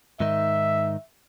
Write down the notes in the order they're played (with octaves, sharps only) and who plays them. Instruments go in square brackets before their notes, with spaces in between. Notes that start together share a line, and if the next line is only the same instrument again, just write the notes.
[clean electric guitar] G#2 D#3 D#4 [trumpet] E5